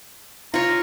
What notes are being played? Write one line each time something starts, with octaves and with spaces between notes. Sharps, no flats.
F4 C#5 A#5